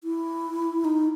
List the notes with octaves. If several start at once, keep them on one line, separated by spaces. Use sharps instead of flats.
E4
D#4